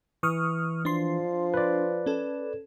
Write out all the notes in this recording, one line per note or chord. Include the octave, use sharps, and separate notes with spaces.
E3 C#6 D#6 F6
F3 D4 C6
B4 D5
C#4 A4